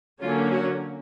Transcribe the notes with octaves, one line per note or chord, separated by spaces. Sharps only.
D3 F#3 A#3 C#4 F4
F#4